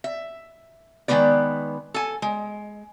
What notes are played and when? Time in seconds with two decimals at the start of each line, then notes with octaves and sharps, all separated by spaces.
0.04 E5
1.08 D#3 G#3 B3 B4 D5
1.94 A4 G#5
2.22 G#3